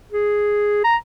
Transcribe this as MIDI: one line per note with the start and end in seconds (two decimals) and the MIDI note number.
0.11 0.81 68
0.84 0.96 82